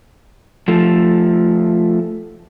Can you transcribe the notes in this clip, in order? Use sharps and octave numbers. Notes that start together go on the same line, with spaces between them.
F3 A3